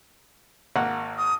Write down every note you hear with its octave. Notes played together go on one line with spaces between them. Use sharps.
G#1 A#3 F#5
D#6